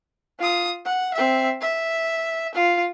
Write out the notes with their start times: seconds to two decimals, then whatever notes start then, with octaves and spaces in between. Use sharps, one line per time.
0.39 F4 D#6
0.85 F#5
1.13 C4 E5
1.61 E5
2.55 F4